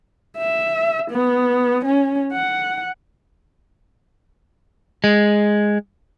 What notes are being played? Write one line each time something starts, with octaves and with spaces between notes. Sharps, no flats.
E5
B3
C#4
F#5
G#3